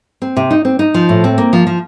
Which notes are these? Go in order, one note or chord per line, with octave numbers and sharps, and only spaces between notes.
C4
C3
D#4
C4
D#4
F3
A2
C4
A#3
F3
F3